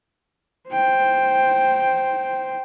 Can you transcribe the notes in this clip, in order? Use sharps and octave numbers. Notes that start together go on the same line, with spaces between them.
C5 G5